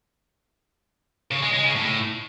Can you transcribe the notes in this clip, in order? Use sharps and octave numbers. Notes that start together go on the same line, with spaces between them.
C#3
G#3
G#3
C#3
A2